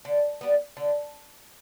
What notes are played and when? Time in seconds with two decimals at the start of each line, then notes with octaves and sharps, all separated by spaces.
0.05 D3
0.41 G3 B3
0.77 D3